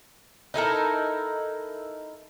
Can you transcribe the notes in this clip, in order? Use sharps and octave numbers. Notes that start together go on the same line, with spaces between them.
D#4 E4 A4 A#4